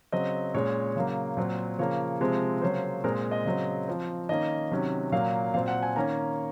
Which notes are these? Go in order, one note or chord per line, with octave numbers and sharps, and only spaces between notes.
C#3 F#3 C4 D#5
A#2 G#3 C#4 C#5
C#3 F#3 A#3
A#2 F#3 C4
C#3 F3 A#3 C#5
C3 F3 G#3 C4
C#3 F#3 A#3 C#4 C5
A#2 G#3 C4 A#4
D#5
C#3 F#3 C4
F3 C4
D#3 A#3 C#4 D#5
C3 D#3 F#3 C#4
A#2 F#3 A#3 F5
A#2 F#3 C4 F5
F#5
G#5
D#3 A#3 C#4 A#5